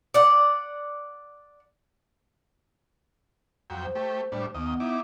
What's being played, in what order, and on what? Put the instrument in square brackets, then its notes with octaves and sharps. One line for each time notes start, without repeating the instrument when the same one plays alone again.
[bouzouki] D5 F#5
[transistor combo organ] F2 F#3 G5
[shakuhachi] C5
[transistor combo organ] A3 G4
A2 G3 D4
[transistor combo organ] D#2 D#5 [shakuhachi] B3
[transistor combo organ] D#4 E4 D6